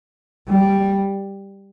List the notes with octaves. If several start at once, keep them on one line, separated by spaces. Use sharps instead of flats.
G3